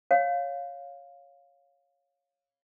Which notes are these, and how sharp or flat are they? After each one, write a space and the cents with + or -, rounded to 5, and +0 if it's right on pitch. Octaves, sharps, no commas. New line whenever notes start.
C#5 +0 F5 +5